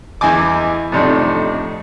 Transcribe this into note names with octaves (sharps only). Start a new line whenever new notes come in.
E2 E3 E4 D#5 G#5 D6
F2 A2 C3 D4 D#4